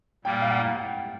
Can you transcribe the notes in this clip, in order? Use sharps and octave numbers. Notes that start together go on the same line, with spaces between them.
A#2 G3 A#3 G5
F5
F#5